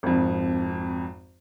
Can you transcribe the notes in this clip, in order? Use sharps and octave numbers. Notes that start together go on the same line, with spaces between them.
G#1 F2